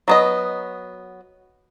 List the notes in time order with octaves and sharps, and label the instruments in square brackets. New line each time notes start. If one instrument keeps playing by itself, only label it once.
[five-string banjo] F#3 B3 D#5